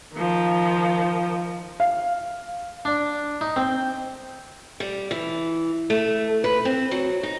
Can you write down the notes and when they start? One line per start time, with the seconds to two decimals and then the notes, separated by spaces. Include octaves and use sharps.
0.14 D#3 F3
1.80 F5
2.85 D4
3.41 D#4
3.56 C4
4.80 G3
5.11 E3
5.90 A3
6.44 B4
6.65 C4
6.91 F#3
7.23 D#4